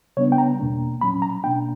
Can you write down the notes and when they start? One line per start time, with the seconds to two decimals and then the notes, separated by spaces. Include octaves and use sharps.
0.17 C#3 G3 B3 D4 C#5
0.32 G5
0.38 A#5
0.59 E2 B2 A#3 D4
1.01 A#2 F#3 C#4 B5
1.22 A#5
1.44 B2 A#3 D4 G5